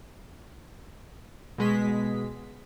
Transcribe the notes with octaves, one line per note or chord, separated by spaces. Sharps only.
B2 G#3 B6